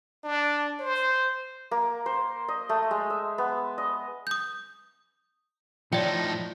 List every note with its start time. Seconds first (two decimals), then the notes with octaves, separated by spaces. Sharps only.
0.24 D4
0.80 C5
1.71 A#3
2.06 C5
2.48 D#5
2.69 A3
2.91 G#3
3.10 E5
3.38 B3
3.78 D#5
4.27 D#6 G6
5.93 A2 F3 D#4 C#5 D5 G5